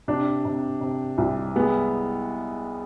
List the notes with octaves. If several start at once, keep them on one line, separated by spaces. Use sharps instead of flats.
C3 D4
C3
C3
C2
G#3 B3